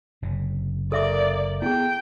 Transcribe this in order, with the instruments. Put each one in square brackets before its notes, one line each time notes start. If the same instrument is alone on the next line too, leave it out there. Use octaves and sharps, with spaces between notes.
[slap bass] F#1 C3
[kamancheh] A#3 D5 [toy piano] A4 E5 D6
[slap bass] B3 [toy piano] E4 G#4 [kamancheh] G5